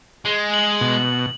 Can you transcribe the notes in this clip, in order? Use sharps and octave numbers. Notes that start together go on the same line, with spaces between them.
G#3
F#7
B2